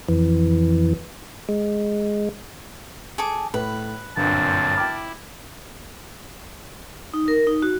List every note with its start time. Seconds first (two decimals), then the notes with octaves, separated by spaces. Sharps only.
0.08 F2 E3
1.49 G#3
3.18 G#4 A4 D6
3.54 A2 B4
4.17 G1 F#2 A#2 C4 A5
4.75 E4 G5 D6 F6
7.14 D#4
7.28 A#4
7.47 D#4
7.62 F#4